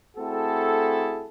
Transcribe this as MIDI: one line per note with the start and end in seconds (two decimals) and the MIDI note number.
0.17 1.28 57
0.17 1.28 60
0.17 1.28 64
0.17 1.28 66
0.17 1.28 68
0.17 1.28 69